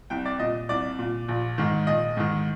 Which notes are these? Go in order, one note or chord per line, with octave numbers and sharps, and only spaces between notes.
C2 G5
D5
A#2 D#5
C2 D5
A#2
A#1
G#2 D#3
A#1 D#5
G#2 D#3